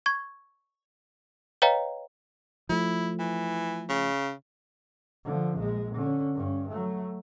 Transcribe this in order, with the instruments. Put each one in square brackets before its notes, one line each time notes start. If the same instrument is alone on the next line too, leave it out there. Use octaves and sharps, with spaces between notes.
[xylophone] C#6 G#6
B4 C#5 D#5 F5 G5 A#5
[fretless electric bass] F3 A3 [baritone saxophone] E4
[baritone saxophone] E3
C#3
[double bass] D3 F3
A#1 G#3
D3 C#4
G2 C#4
F#3 A3